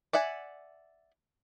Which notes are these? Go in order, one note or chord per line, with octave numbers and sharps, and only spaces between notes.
D5 E5 F#5 G#5